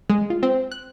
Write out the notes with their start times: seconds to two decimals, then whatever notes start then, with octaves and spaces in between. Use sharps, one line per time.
0.10 G#3
0.30 F4
0.43 C4
0.72 F#6